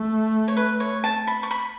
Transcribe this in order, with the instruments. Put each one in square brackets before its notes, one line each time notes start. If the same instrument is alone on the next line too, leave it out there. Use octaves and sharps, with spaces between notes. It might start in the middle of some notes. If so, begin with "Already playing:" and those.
Already playing: [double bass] A3
[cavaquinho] C#5
B4
C#5
A5
B5
C#6
B5